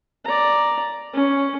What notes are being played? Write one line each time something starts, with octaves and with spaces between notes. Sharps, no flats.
D5 A#5
C#4